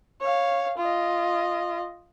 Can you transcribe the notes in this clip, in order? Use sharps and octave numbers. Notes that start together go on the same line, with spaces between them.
C#5 F5
F4 D#5